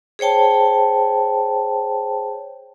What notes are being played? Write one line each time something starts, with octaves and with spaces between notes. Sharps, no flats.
G#4 C5 C#5 G5 A5